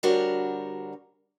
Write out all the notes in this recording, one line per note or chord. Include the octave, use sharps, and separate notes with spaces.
D2 G3 D4 F#4 A#4 C#5